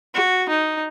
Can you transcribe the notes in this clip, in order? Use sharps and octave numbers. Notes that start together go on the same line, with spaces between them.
F#4
D#4